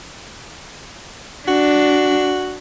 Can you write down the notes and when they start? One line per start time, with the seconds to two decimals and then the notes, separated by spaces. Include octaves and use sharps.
1.48 D4 F#4